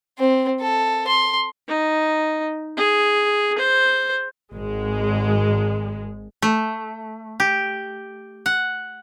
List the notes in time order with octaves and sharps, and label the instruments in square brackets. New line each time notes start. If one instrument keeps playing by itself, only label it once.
[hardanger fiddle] C4
A4
C6
[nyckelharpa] D#4
G#4
C5
[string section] G#1 G#3
[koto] A3
G4
F#5